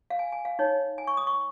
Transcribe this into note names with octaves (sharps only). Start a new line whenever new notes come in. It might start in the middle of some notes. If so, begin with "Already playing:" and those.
F5
G#5
G#5
F5
D#4 C#5
G#5
C#6
D#6
C#6